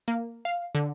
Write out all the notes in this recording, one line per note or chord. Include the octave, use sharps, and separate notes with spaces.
A#3
F5
D3